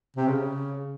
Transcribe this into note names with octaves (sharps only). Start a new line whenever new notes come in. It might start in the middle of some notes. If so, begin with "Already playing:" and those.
C3
C#3